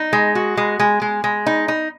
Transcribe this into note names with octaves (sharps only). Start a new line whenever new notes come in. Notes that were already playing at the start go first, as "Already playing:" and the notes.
Already playing: D#4
G#3
F#4
G#3
G#3
G#3
G#3
D#4
D#4